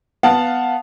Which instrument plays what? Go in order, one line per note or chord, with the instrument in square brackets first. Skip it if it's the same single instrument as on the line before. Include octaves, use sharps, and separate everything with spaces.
[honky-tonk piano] B3 F5 F#5 A5